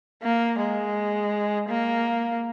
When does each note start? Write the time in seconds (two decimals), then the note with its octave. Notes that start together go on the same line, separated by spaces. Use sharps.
0.23 A#3
0.59 G#3
1.69 A#3